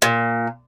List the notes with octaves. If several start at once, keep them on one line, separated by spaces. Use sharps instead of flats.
A#2